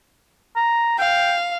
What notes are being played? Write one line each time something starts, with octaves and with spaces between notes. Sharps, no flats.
A#5
F5 G5